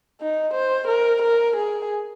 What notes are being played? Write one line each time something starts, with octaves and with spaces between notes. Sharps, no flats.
D#4
C5
A#4
A#4
G#4